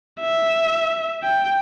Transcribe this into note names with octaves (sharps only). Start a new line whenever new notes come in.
E5
G5